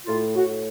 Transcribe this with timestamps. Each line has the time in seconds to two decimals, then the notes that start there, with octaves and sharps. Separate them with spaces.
0.06 A2 F4
0.35 A2 F#4